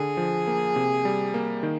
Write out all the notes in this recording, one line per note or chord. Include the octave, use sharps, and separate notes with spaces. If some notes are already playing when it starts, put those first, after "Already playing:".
Already playing: D3 G#4
F3
A#3
C3
G3
A#3
D#3